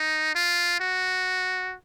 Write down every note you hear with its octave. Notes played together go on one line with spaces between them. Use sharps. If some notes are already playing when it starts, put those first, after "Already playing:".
Already playing: D#4
F4
F#4